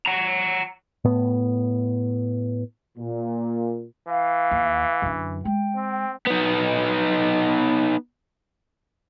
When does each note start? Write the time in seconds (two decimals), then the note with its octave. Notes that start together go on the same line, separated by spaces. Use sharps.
0.06 F#5 A#5
1.04 A2 B3
2.97 A#2
4.08 E3 F5
4.51 D#2
5.02 F#2 D3
5.45 G#3 G5
5.76 C4
6.27 B3 D#4